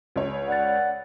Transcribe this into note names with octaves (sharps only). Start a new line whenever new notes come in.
C#2 C#5
D5 F#5 A6